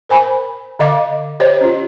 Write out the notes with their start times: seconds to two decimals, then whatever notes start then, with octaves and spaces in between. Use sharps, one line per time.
0.09 A#4 C5 G#5 B5
0.79 D3 D#5 F5 D6
1.40 G4 C5 C#5 D#5
1.61 C#4 F4